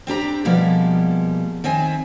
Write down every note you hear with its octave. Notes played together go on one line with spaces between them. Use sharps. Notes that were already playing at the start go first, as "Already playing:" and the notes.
C4 D4 G4 A#5
B2 F3 G3 G#3 A#3
D#3 C4 E5 G#5